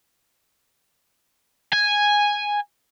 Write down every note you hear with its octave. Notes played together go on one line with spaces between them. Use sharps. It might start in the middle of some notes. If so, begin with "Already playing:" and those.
G#5